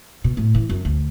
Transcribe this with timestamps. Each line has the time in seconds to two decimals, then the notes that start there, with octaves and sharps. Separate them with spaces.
0.24 B2
0.37 A2
0.55 E3
0.69 F#2
0.85 D2